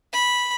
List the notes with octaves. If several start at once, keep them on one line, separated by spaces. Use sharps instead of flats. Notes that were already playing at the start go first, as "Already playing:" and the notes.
B5